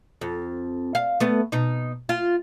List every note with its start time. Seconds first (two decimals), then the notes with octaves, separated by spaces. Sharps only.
0.21 F2
0.95 F5
1.20 A3 B3
1.52 B2 D#4
2.09 F4